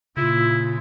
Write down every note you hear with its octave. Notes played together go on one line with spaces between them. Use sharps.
A#2 C#3 E4 F4